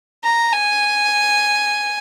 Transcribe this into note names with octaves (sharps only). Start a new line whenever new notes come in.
A#5
G#5